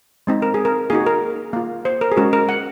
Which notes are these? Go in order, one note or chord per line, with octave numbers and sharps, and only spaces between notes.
G#3 C4 D#4
A#4
G#4
A#4
A#3 D#4 F#4 G#4
A#4
A#3 F4
C5
A#4
G#4
G#3 C#4 F#4 A#4
A#4
F#5